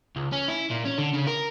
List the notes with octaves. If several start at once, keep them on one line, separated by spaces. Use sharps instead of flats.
C#2
C#4
E4
A#2
C#4
D3
C#3
A#4